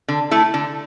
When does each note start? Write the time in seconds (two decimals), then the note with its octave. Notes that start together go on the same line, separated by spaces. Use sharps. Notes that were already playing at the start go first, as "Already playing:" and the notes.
0.08 D3
0.31 A3 E4 A4
0.54 D3